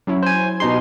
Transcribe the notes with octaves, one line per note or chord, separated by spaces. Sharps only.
F#3 C#4 E4
C5 G#5
B2 D#4 G4 C6